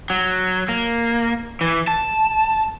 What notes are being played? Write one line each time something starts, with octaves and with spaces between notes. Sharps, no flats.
F#3
A#3
E3
A5